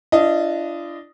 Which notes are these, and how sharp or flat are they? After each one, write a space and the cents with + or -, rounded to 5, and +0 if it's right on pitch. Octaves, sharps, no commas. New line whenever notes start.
D4 +0 F4 -45 D#5 +0